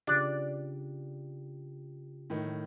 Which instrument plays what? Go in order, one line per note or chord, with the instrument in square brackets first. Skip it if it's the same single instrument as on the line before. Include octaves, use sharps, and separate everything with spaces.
[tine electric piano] C#3 F4 G4 [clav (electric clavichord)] D4 D5
[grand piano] A2 D#3